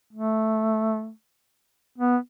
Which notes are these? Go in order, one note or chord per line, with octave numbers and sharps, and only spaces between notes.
A3
B3